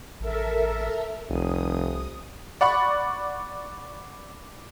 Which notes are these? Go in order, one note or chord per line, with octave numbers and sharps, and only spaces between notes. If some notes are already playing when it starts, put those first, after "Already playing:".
A1 A4 A#4 E5
F1 C2 D#6
D5 F#5 B5 C#6